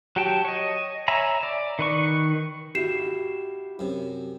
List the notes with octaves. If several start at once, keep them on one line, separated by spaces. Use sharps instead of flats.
F#3 F#4 G4 G5 A5
C#5 D#5
C#5 E5 G#5 A#5 B5
D5
D#3 B4 C#6
E4 F#4 G4 C7 E7
F#2 C3